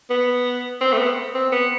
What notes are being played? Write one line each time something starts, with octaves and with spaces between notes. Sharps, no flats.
B3
C4
A3
B3
C4
B3